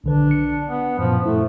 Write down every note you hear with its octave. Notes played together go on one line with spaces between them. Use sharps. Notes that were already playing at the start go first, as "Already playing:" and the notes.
B1 D3 D4 B4
C#7
B3
F#2 A#2 F3
A3 E4